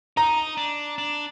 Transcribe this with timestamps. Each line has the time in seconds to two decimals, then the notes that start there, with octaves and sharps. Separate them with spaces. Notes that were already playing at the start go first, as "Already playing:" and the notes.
0.17 D#4 A#5
0.57 D4
0.98 D4